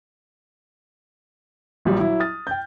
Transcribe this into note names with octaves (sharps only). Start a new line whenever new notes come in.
A#1 A#2 F#3 G3
F#3 E4
D#6 F6 A6
G5 G6